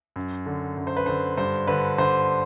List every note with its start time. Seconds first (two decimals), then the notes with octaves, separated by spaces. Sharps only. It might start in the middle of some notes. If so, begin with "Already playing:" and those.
0.16 F#2
0.46 D3
0.77 F#2
0.87 C5
0.97 B4
1.06 D3 C5
1.37 G2 C5
1.67 D3 B4
1.98 D3 C5